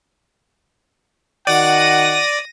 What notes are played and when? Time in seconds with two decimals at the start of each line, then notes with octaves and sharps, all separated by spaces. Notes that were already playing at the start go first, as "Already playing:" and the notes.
1.47 D#3 F#4 D5 F#5 A#6 D#7